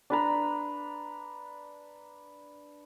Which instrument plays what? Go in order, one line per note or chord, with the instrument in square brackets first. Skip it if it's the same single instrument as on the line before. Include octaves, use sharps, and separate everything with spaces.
[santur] D4 B4 A#5